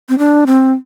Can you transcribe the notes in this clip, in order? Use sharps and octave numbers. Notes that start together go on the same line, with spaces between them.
C4
D4
C4